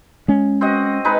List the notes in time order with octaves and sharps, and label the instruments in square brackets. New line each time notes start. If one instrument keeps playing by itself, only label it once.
[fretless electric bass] G#3 C#4
[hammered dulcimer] C4 F#4 D#5
G#3 D#4 B4